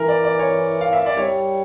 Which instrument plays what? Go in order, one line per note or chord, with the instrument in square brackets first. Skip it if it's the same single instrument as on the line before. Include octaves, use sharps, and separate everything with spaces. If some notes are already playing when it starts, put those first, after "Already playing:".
Already playing: [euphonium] E3 [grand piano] A#4
[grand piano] D5
D5
C#5
F5
E5
D5
[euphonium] G3 [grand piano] C#5